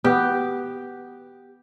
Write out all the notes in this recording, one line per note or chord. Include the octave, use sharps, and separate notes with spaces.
B3 G4